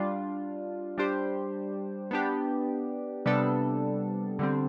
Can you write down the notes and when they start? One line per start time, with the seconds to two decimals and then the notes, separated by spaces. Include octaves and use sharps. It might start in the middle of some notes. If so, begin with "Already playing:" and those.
Already playing: G3 D4 F4
0.98 G3 D4 G4 C5
2.11 B3 D4 G4
3.26 C3 G3 B3 D4 A4
4.39 D3 G3 C4